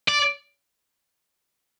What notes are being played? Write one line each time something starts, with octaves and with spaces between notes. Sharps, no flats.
D5